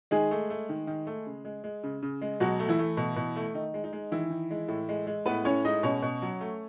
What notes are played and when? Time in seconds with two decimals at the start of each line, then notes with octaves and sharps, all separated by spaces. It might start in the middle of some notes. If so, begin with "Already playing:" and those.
0.11 D#3 G#3 G#4
0.31 A3
0.50 A3
0.69 D#3
0.87 D#3
1.07 A3
1.26 C#3
1.45 G#3
1.64 G#3
1.84 C#3
2.03 C#3
2.22 G#3
2.40 B2 F#3 F#4
2.59 A3
2.69 E3 E4
2.79 A3
2.97 B2
3.16 B2
3.36 A3
3.55 D#3 D#4
3.74 G#3
3.84 D#4
3.93 G#3
4.12 D#3 E3 E4
4.30 D#3
4.51 G#3
4.68 A2
4.89 G#3
5.07 G#3
5.26 A2 B3 B4
5.45 A2 C#4 C#5
5.65 G#3 D#4 D#5
5.83 B2 C#4 C#5
6.03 B2
6.22 F#3
6.41 A3